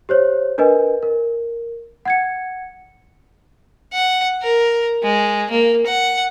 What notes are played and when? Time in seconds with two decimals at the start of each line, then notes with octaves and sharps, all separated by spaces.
0.09 G4 C5 C#5
0.58 D4 A#4 B4 D#5 G#5
1.03 A#4
2.05 F#5 G#6 C#7
3.93 F#5
4.42 A#4
5.03 G#3
5.51 A#3
5.87 F#5